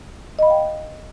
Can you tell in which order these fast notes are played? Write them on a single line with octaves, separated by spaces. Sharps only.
D#5 B5 F5 G5